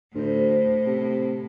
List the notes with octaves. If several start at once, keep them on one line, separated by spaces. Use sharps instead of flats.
D2 A2 F4 C5
C3